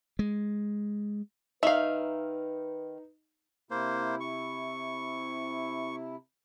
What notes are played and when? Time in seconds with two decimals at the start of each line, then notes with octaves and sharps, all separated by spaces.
0.19 G#3
1.63 D#3 D#4 B4 E5 F5
3.71 C3 A#3 E4 C5
4.20 C#6